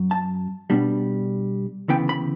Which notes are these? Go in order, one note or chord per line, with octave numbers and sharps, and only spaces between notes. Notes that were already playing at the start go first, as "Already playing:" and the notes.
Already playing: F#2 F#3
A5
B2 G3 B3 D4
D2 C#3 E3 B3 G5
B5